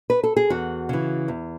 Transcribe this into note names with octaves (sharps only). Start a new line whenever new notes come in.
B4
A4
G#4
E2 F#4
C#3 E3
E2